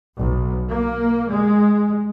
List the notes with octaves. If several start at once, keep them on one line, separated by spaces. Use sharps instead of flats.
B1
A#3
G#3